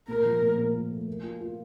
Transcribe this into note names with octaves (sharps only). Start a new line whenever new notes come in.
A#2 A#4
F3
A#2
A#2
A#2
A3
A#3
F4
F4